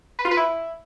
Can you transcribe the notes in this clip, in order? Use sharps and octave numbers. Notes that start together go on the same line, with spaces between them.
B4
F4
B4
E4